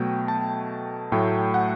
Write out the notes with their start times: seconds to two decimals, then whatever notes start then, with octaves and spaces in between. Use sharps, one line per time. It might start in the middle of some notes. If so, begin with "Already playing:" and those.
Already playing: B2 F#3 A3 G5
0.28 A5
1.12 A2 F#3 A3 G5
1.54 F#5